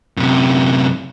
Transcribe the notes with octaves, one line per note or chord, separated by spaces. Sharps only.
F#2 C3